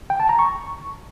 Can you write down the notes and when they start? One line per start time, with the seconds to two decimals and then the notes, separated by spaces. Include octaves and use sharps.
0.10 G5
0.20 A5
0.29 A#5
0.39 C#6